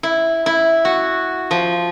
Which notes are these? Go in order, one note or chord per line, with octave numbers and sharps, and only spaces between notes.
E4
E4
F#4
F3